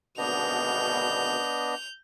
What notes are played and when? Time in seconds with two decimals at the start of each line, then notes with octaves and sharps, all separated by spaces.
0.18 G#1 D2 B2 B3 D4 D#5 G6 F7